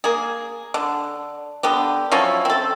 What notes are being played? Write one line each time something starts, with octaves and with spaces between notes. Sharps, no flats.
A#3 G#4
D3
D3 B3 G4
F3 F#3 C#4 E4
C4 A4